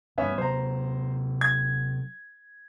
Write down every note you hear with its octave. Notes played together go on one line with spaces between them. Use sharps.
E1 G2 B3 C#4 E5
C3 F#3 C5 A#5
G#6